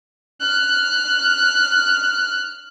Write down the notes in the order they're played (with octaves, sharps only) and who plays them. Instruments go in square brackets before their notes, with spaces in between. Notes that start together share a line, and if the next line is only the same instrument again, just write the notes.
[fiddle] F6 F#6